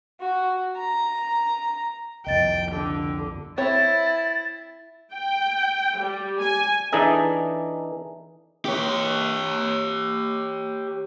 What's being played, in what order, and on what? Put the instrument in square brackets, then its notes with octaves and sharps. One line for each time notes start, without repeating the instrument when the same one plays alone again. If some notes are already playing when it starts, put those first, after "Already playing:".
[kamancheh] F#4
A#5
[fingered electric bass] C2 F2 [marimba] D#5 A6 [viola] G5
[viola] D3
[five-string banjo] C4 C#5 [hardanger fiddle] E4 [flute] A6
[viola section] G5
G3
G#5
[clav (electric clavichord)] E3 D4 D#4 G#4 A4 D#5
[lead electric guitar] G4 C#5